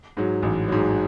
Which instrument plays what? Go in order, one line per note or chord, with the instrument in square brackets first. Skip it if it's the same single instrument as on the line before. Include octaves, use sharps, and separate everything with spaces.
[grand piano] G#2 F#3
A1
G#2 F#3